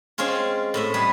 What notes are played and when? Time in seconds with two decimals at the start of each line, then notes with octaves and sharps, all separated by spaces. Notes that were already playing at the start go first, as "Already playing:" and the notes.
0.18 G#3 C4 C#4 F4 G#4
0.74 A2 D#5 E5
0.94 G3 G#4 B4